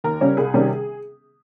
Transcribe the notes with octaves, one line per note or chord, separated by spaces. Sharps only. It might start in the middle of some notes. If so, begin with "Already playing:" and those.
D#2 A#4
C#3 G3 C#4
C2 G#4
C3 D#3 G3 C#4